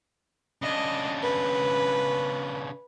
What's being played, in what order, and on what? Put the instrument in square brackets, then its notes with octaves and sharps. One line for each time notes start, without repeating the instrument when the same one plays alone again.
[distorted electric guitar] C#3 D4 [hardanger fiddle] D#5
[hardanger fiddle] B4